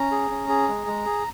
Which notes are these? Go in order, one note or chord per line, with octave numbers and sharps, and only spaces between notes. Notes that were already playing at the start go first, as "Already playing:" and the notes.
Already playing: C#4 A#5
G#4
C#4
G#4
G#3
G#3
G#4